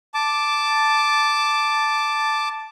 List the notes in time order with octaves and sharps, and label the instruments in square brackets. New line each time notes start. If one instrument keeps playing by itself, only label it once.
[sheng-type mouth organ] A5 D6